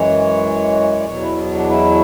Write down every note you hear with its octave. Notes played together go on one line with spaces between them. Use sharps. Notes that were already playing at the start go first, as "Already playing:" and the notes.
Already playing: F#2 E3 G#3 C#5
D5
E2 B2 F#3 C#5
E4
B3
D4
E4